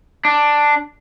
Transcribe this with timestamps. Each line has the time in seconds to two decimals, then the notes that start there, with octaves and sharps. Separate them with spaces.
0.25 D4